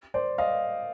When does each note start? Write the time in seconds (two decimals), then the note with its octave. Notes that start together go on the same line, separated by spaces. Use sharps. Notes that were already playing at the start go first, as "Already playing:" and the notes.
0.14 C5 D5
0.38 D#5 F5